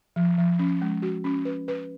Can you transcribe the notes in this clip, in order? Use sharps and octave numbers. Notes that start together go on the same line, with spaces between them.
F3
F3
C#4
G#3
F#4
C#4
B4
B4